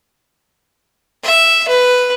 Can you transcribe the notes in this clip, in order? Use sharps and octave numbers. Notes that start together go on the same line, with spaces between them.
E5
B4